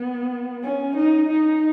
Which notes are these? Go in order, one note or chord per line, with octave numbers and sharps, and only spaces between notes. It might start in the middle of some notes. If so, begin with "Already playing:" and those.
Already playing: B3
C#4
D#4
D#4